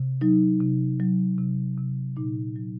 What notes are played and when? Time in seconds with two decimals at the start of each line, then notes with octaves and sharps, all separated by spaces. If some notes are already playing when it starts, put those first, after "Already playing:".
Already playing: C3
0.21 F#3 D#4
0.61 C3
1.00 F#3
1.38 C3
1.78 C3
2.16 A#2 D#4
2.56 F#3